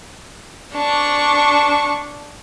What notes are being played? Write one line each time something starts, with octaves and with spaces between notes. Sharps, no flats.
D4 C#6